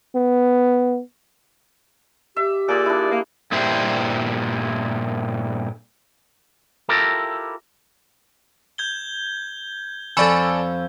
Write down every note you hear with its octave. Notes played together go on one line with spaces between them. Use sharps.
B3
G4 E5
A#2 G#4 D5
D4 E4
A#3
G2 A#2 E4 G4 C5
E4 F4 G4 A4 A#4
G6 G#6 G7
F2 F3 A4 D5 G#5 B5 C#6 E6